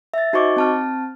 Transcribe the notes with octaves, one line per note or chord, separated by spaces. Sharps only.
E5 A6
D#4 F#4 C5 D#5 C#6 D6
C4 A5 F6